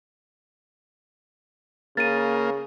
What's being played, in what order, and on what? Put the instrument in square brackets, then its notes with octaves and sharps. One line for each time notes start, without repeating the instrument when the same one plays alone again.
[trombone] C#3 [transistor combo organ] A#3 [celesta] A6 D#7